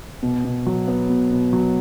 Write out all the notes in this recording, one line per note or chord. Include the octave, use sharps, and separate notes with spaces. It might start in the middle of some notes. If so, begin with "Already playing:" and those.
B2
B2
F#3
B3
B2
B2
F#3